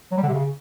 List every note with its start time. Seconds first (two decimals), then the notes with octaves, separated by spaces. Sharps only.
0.11 F#3
0.17 G3
0.23 D3
0.28 C3
0.34 C#3